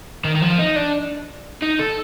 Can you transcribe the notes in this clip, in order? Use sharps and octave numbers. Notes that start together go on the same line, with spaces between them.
D#3
D#3
F3
D#4
D4
D#4
A4